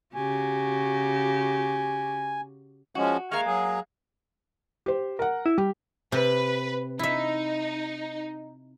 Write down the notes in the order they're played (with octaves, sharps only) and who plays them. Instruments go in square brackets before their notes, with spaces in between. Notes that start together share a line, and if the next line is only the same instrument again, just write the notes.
[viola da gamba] C#3 F#4 G4 [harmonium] G#5
[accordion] F3 G#3 C#4 [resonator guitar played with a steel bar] F#4
[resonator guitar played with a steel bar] G#3 A#3 [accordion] C#6 F6
[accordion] F#3 G#4
[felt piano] G4 C5
A#4 F#5
[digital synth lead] E4
[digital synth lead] G3 [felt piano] G4
[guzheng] C3 [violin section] B4
[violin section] D#4 [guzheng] E4 E5